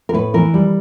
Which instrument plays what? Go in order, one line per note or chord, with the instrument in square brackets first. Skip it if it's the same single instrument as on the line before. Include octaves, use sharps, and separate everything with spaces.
[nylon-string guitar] A#4
A2 B4
E3 A#4
G3